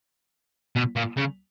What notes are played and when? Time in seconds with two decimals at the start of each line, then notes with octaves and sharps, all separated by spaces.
0.76 B2
0.96 A#2
1.17 C#3